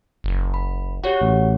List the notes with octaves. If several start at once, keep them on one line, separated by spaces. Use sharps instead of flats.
F#1
B5
F#4 G4 C#5 F#5
A1